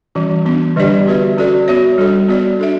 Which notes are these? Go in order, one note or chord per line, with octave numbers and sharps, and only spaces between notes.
E3 G3 C#4 F#4
E3 B3 D4
D3 G3 D4 G4 D5
B3 F#4 B4 E5
C#4 F#4 A4 D5
B3 F#4 C#5 E5
G3 D4 F#4 A4 C#5
B3 F#4 A4 D5
D4 A4 E5